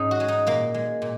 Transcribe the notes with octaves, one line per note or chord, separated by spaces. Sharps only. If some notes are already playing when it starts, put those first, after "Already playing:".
Already playing: G#2 C#4 D#4
F#4
G#3
D#4
A#2 A#3
G#3
A#2